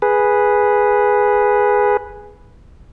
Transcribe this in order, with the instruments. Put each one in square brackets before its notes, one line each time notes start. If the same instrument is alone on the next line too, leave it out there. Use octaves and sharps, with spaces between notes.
[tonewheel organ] G#4 B4